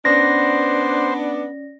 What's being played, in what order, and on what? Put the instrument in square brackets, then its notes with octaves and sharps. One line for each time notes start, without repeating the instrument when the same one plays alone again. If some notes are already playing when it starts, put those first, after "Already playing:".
[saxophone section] B3 D4 [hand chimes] C#4 D5 [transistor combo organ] C5 [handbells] A#6